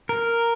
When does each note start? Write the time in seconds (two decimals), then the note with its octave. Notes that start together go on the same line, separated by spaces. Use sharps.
0.09 A#4